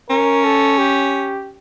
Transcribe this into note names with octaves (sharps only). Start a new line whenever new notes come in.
C#4 A#4
A4
G4